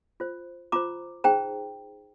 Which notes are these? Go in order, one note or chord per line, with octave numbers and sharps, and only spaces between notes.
F4 C5
F4 C5 A#5 D6
D#4 G#4 C5 G5 A#5